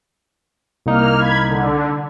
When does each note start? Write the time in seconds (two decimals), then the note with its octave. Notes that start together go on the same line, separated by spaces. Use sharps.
0.86 C2 A#3 D#4 F6
1.18 B5 G#6
1.48 D3